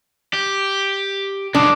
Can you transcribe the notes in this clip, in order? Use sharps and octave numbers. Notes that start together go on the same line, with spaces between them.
G4
F#2 G#3 D4